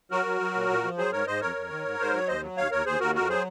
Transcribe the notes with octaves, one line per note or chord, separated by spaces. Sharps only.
F#3 F#4 A#4
F#3
F#3
A#2
A#2
F3
F#3 G#4 C5
G#2 A#4 C#5
G#2 C5 D#5
F2 A#4 C#5
F2
D#3
G#2
G#2 C5
F#3 C#5
D#2 C5 D#5
F#3
D#2 C#5 F5
D#2 A#4 C#5
D#2 G#4 C5
D#2 F#4 A#4
F2 F#4 A#4
F#3 G#4 C5